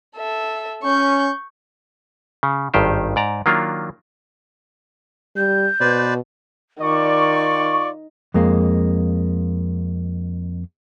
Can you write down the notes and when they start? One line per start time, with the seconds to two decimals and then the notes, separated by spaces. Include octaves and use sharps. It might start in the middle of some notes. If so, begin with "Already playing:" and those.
0.16 A4 E5
0.84 C#4 C#6 G6
2.43 C#3
2.74 G#1 G2 D#3 G4 C5
3.16 G#2 D5 A#5
3.46 D#3 F#3 A#3 D4 F4
5.37 G3 G6
5.81 B2 B4 C5 D5
6.81 D#3 F4 D5 C#6
8.34 F2 G#3 A#3